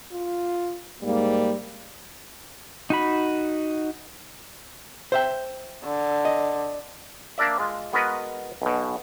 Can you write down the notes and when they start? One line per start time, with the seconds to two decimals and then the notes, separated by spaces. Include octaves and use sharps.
0.12 F4
1.03 G#2 G3 A#3
2.90 D#4 F#4 B5
5.12 C5 E5 G5
5.85 D3
6.25 D#5
7.38 A#3 D4 A#4 D5 E5
7.59 G#3 F4
7.93 G#3 B3 F#4 A#4 B4 D#5
8.62 B1 B2